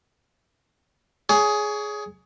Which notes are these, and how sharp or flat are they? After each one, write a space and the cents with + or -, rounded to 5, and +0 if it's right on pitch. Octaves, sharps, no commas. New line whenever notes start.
G#4 +10 C#5 +30